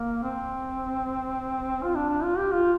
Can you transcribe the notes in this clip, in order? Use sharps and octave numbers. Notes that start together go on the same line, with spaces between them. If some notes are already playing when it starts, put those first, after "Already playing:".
Already playing: A#3
C4
F4
D4
D4
F4
G4
F4